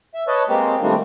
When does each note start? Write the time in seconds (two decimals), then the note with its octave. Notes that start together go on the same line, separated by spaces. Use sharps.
0.14 E5
0.28 B4 C#5 D#5 A5
0.49 G#3 A#3 C4 G4
0.82 D#3 F3 G3 A3 C4 D4